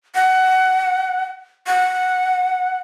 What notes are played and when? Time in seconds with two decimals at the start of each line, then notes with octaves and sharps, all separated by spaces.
0.15 F#5
1.67 F#5